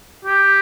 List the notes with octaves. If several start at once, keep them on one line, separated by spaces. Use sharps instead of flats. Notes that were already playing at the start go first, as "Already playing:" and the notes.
G4